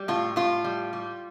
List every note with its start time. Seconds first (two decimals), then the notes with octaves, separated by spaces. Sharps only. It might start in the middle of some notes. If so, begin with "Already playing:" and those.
Already playing: G3
0.08 A2 F4
0.36 A2 F4
0.64 G3
0.93 G3